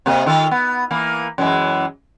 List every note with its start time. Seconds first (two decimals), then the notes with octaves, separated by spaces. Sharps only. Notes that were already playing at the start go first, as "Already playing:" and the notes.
0.06 C3 A#3 D#5
0.26 D#3 F4 A4
0.51 B3
0.91 E3 A#3
1.38 F#2 E3 G#3